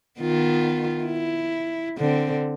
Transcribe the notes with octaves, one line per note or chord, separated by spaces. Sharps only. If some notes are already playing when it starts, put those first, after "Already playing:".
D#3 B3 F4
E4
D3 C4